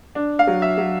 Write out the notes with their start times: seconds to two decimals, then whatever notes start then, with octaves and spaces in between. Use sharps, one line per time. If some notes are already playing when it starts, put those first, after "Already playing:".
0.15 D4
0.39 F5
0.47 F#3
0.62 E5
0.78 F#3